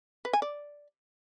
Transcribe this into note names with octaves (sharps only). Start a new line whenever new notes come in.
B4
G#5
D5